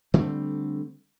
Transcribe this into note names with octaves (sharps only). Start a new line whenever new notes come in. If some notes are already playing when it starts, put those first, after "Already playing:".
D3 G3 A3 C4